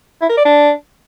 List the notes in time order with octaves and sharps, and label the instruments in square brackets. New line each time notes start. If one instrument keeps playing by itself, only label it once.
[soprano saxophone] E4
A#4
D5
D4